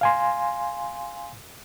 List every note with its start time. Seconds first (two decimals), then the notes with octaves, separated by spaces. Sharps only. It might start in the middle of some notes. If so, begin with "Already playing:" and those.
0.01 F5 G#5 C6